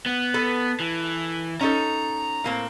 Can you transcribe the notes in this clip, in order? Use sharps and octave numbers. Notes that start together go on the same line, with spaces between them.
B3
A4 B4
E3
C#4 D#4 A4 A#5
A2 A#3 C4